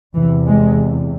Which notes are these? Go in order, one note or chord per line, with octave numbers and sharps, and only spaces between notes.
E2 C3 E3
G#3